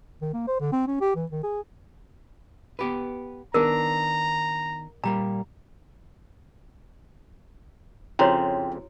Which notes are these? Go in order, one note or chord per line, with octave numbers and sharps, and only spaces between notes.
D#3
A#3
C5
D3
C4
C#4
G4
E3
D#3
G#4
B3 G4 B4
D#3 B3 D4 A#4 A#5
A#2 G3 A#3 A#5
F2 C#3 E4 F#4 C5 C#5 G5